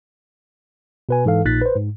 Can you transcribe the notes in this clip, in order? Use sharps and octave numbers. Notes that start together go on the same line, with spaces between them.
B2 B4 G#5
G#2 E3 A4 F5
A#1 A#2 D#4 F#6 A6 B6
B4 C5
G#2